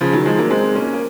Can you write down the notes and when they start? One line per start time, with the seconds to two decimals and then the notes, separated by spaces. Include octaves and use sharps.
0.01 C#3 F3
0.13 D#3 F#3
0.26 F3 G#3
0.38 F#3 A#3
0.50 G#3 C4
0.75 A#3 C#4
0.93 A#3